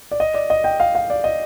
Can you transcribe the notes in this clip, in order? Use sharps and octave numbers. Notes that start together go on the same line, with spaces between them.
D5
D#5
D5
D#5
G5
F5
F5
D5
D#5